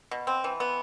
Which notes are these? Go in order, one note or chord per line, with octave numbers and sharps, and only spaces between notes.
B2
C4
E3
B3